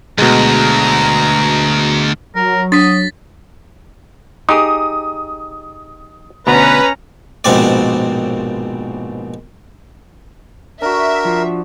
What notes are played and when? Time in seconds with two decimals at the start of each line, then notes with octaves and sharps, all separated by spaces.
0.18 D2 B2 G#3 A#5
2.36 F#3 A#4
2.72 D4 D#6 A6 B6
4.49 D#4 G4 G#4 D#6
6.47 D2 B2 B3 C#4 B4 A#5
7.44 A#1 G#2 B2 C4 D5
10.82 D4 F#4 A#4 E5
11.25 F3